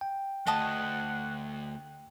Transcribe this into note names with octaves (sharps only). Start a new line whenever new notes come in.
G5
D2 A3 D#5 F#5 A5 D#6